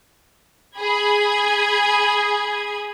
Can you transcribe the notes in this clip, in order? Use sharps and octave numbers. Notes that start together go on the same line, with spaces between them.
G#4 B5 G#6